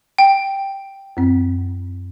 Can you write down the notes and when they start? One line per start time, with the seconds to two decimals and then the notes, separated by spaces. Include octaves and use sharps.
0.18 G5
1.17 F#2 C4